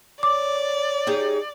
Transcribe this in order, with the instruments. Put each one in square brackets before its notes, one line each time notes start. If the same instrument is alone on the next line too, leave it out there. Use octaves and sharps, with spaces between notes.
[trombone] C#5 [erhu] D5 [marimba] D6
[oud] D#4 G4 G#4